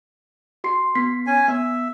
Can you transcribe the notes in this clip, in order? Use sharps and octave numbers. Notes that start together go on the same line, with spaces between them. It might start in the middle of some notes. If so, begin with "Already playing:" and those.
F#4 C6 C7
B3 B6 C7
C#4 G#5
B3 E5